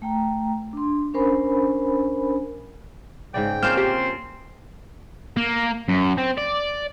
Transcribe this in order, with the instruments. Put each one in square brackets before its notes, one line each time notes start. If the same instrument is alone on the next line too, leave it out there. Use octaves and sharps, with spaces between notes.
[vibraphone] A3 G5 A#5
D4 C6
C#4 D4 A#4 C5 G#5 B5
[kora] G#2 C#3 D5 [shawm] G5
[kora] A#3 C#4 F4 [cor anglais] C4 [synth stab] F6 G6 E7
[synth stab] G4 [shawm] C6
[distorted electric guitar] A#3
F#2
C4
D5